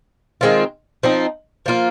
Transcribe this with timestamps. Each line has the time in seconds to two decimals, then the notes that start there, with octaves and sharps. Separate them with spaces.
0.41 D#3 G#3 C4 F4
1.03 F3 C4 D#4
1.66 F3 A#3 F4